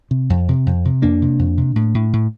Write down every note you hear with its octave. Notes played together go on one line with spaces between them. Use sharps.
C3
F2
C3
F2
C3
F2 A#3 D4
C3
F2
C3
A2
A2
A2